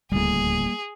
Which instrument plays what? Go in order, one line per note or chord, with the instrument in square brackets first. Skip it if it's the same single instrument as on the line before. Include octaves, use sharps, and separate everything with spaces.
[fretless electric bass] D1 C#2 A2 [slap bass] G3 A#3 [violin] G#4